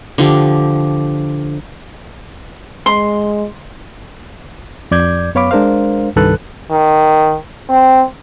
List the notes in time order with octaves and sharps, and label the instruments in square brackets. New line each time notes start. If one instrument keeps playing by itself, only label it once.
[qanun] D3 F3 G4
[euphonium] G#3 [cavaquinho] C6
[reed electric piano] F2 D5 D6 G6 G#6
F#2 B3 C#5 F5 B5 D6
G#3 D4 A#4 C5 F5
C2 G2 D#3 A4 B4 F#6
[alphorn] D#3
C4